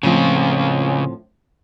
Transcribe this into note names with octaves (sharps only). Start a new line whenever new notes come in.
A2 C#3 F3 C4 F4